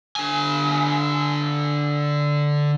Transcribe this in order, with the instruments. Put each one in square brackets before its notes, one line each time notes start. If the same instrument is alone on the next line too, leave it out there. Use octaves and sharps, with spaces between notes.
[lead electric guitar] D3 G#5